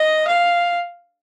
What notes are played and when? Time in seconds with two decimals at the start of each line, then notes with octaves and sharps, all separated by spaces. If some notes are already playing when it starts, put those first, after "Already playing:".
Already playing: D#5
0.27 F5